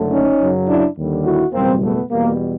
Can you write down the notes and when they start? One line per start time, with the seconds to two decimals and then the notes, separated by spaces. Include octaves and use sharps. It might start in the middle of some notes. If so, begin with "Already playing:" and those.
Already playing: F#1 F#2 D3 F#3 A3
0.10 C#4 D#4
0.38 F#2 C#3 F#3
0.67 D4 E4
0.95 D#2 D3 G3
1.24 E4 F#4
1.52 F#1 E2 B2 G3 A#3 C4
1.81 A3 B3
2.10 E2 B2 G3 A#3